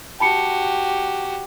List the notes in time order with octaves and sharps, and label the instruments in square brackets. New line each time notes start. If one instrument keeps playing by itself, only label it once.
[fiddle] F#4 G4 [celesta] A5 B5 C#7